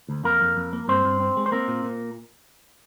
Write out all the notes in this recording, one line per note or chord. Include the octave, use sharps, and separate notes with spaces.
D2
F2 A#3 A#4
F2
F2
A#3
G2 C4 C5
G2
C4
G#3
C5
A#3 C4 A#4
A#2
A#2